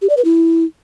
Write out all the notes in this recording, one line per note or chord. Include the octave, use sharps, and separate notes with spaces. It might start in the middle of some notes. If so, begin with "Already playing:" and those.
G4
D5
B4
E4